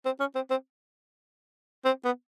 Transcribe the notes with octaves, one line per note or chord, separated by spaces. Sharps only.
C4
C#4
C4
C4
C4
B3